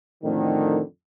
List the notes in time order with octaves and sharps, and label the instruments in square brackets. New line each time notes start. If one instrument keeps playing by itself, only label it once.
[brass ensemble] F2 A2 D3 D#3